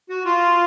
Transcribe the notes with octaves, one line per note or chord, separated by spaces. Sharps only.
F#4
F4